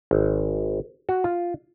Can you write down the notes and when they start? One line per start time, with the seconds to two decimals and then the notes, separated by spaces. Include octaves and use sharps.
0.11 G#1
1.09 F#4
1.24 F4